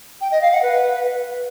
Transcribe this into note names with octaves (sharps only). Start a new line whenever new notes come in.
G5
D#5
F5
F#5
B4